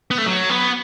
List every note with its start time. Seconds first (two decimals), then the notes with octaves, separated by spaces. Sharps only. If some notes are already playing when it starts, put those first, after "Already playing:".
0.11 B3
0.18 A3
0.27 F#3
0.50 B3